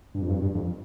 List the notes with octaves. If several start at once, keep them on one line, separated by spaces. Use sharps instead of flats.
G2
F2
G2
G2
F2